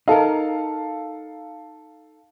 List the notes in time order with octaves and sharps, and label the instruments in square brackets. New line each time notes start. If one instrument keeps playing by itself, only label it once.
[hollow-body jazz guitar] D#4 A#4 [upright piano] A4 F5